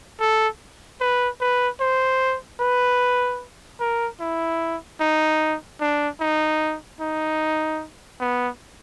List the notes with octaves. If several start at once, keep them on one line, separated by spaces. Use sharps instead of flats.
A4
B4
B4
C5
B4
A#4
E4
D#4
D4
D#4
D#4
B3